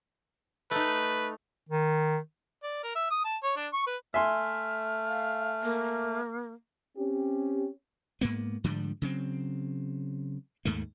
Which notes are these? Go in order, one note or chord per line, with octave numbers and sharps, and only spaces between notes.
A3 D#4 B4
D#3
D5
A#4
E5
D#6
A5
C#5
D4
C#6
B4
A3 E5 G#5 C6 F6
F5
A#3
C4 C#4 G4
G#2 A#3 B3
G#2 D3 F3 G3
C#3 F#3 C4
D#2 G#2 A3 A#3